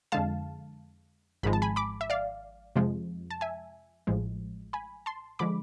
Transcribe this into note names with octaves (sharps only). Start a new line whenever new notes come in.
F2 D3 G#3 F5 A5
G#1 G#2 F3 G#3 B5
A5
G#5 B5
B5 D6
E5
D5 F5
F2 C3 F3 G#3
A5
E5 G#5
A1 A2 F3 G#3
G#5 B5
A5 C6
D3 F3 G#3 B5 D6